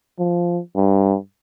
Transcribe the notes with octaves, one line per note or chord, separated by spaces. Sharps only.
F3
G2